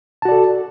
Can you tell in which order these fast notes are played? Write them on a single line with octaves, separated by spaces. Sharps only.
A5 F#4 D5 A4